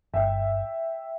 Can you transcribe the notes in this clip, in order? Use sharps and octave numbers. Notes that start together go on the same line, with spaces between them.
G1 E5 G5